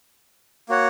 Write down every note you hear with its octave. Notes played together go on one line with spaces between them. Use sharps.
A#3 F#4 C#5 F#5